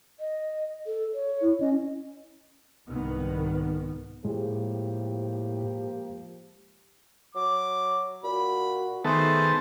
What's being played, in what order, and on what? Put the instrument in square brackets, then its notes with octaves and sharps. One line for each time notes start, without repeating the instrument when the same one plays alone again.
[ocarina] D#5
A4
C#5
[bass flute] E4
[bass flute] C#4 [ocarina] D#5
[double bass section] C2 G#2 D#3 B3
[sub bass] A2 [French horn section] F3 A#3 G4 [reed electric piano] G#3
[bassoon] F#3 [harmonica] D6
[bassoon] A#2 [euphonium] F#4 [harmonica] B5
[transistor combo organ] D#3 B3 A5 [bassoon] A3 [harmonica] G#4 C5 C6